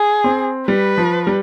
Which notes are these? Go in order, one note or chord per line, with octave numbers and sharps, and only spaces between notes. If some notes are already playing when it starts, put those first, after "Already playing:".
Already playing: G#4
C4
G3 B4
F3
G3